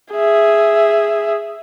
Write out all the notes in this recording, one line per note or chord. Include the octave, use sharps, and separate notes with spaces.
G#4 E5